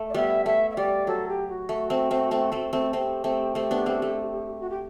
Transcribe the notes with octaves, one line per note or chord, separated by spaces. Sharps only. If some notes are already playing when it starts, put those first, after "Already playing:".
Already playing: A3
D5
G3 B3 E5
A3 E5
E5
G3 D5
F#3 A4
G4
F#4
A3
A3 C4
A3 C4
A3 C4
A3 C4
A3 C4
A3 C4 G4
A3 C4
A3 C4
B3 D4
A3 C4
A3
F#4
G4